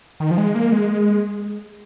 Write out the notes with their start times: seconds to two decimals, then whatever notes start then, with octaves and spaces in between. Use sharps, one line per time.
0.20 D#3
0.31 F3
0.38 G#3
0.55 A#3
0.72 G#3